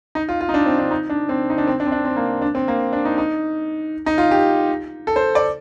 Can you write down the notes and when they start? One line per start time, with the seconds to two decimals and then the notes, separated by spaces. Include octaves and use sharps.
0.15 D#4
0.29 F4
0.41 F4
0.49 D#4
0.54 D4
0.66 C4
0.79 D4
0.91 D#4
1.10 D4
1.29 C4
1.50 D#4
1.58 D4
1.67 C4
1.80 D4
1.86 C4
1.92 D4
2.05 C4
2.17 A#3
2.42 D4
2.55 C4
2.68 A#3
2.93 D4
3.05 D#4
3.18 D#4
4.06 D#4
4.18 F4
4.31 G4
5.07 A4
5.16 C5
5.35 D5